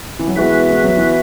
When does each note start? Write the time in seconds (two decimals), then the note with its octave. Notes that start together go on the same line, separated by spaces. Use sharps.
0.19 E3
0.28 F#3
0.36 E3 G#3 B3 F#4 B4 E5
0.70 G#3
0.84 F#3
0.97 E3